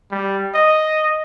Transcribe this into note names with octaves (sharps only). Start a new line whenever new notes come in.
G3
D#5